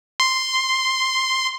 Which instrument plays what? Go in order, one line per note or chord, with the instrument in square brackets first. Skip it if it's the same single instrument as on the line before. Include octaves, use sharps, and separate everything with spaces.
[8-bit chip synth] C6